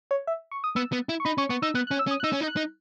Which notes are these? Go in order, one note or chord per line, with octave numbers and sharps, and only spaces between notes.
C#5
E5
C#6
D#6
B3 E6
B3
E4
C#6
D#4 B5
C#4 C#6
B3 C#6
D#4 E6
B3 F#6
F#6
C#4
E6
C#4
D#6
F#6
D#4 E6
C#4
D#4
F#6
D#4